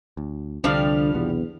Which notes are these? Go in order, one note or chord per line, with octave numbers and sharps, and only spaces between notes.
D2
C2 D3 F3 G3 D4 F5
B1 E2 C3 B3